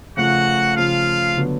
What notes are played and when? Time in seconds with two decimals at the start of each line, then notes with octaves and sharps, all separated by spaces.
0.17 C#3 F3 A3 F#4 F#5
0.76 C#3 F3 A3 F4 F5
1.37 D3 F#3 B3